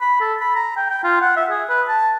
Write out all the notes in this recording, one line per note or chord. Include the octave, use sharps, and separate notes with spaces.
B5
A4
B5
A#5
G5
G5
F4
F#5
E5
G#4
B4
A5